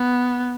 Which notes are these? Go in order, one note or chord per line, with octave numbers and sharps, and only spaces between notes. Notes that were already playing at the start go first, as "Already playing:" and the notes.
Already playing: B3